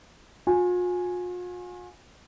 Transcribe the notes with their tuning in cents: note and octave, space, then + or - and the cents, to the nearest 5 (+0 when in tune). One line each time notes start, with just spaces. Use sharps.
F4 +45 G#5 +0